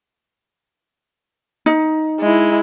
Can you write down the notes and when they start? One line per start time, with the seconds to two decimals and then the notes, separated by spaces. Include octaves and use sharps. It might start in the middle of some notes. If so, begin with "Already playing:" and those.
1.66 D#4
2.20 G#3 E4